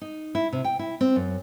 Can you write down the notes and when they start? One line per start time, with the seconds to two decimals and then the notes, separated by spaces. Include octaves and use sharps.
0.01 D#4
0.35 E4
0.53 C3
0.64 G5
0.79 E4
1.01 C4
1.16 F#2